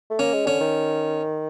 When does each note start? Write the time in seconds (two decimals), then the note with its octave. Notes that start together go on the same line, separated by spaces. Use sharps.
0.10 A3
0.19 A#3 C#4
0.34 G#3
0.47 D3 C#4
0.61 D#3